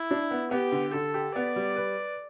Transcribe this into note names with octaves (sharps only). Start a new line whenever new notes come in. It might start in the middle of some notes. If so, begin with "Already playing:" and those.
Already playing: E4
D4
B3
B3 G4
D3
D3 A4
G4
B3 D5
G3
B4